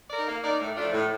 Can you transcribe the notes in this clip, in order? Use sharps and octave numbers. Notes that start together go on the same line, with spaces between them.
D#4 A#4 D5
A#3
D#4 A#4 D5
A2
F3 A3 D4 F4
A2